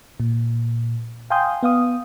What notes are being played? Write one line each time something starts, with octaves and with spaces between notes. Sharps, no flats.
A#2
F5 G5 G#5 C6 D#6 G6
B3 F5 D#6